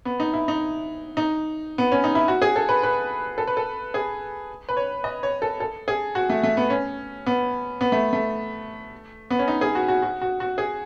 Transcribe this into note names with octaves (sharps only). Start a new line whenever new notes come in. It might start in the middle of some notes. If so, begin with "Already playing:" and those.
B3
D#4
E4
D#4
D#4
B3
C#4
D#4
E4
F#4
G#4
A4
B4
B4
A4
B4
A4
G#4
B4
C#5
D#5
C#5
A4
A4
G#4
F#4
A3
A3
B3
C#4
B3
B3
A3
A3
B3
C#4
D#4
G#4
F#4
F#4
F#4
F#4
F#4
G#4